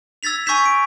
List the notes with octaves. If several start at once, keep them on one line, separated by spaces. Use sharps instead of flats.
E6 G#6 A6 B6 F7
G#5 C#6 E6 G6 B6 E7
D7